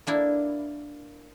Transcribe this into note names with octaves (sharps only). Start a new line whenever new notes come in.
A#3 D4 E4